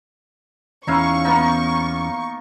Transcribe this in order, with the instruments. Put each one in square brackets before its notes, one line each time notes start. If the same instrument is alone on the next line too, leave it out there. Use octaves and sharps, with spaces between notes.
[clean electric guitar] E2 E3 C#4 [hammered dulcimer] D#4 E4 F5 [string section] C#6
[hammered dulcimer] A#3 B3 D#4